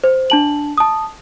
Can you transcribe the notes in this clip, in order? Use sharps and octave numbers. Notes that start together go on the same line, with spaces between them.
C5
D4 A5 F#7
A5 D#6